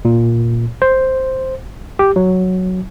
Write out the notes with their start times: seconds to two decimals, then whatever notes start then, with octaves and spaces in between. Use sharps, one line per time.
0.05 A#2
0.82 C5
1.99 G4
2.16 F#3